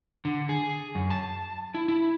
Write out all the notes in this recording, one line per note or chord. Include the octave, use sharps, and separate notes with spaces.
D3
G#4
F#2
A5
E4
E4